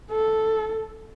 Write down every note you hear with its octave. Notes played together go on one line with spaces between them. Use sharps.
A4